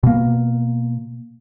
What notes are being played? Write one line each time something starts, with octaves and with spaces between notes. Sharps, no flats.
B2 A#3